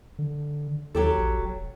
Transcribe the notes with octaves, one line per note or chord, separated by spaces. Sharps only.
D3
D#2 F#3 G4 A4
A#1
E1